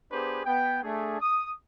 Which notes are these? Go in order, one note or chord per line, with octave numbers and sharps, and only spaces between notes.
B3 D4 G4 G#4 B4 C5
B3 G5
A3 D4 G#4
D#6